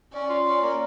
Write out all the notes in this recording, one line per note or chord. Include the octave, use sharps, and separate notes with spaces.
C#4 D5
F4
C#4 D5
A#3